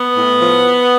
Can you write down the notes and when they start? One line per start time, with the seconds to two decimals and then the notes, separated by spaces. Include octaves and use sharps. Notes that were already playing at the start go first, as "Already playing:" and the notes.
Already playing: B3
0.16 A2
0.40 F3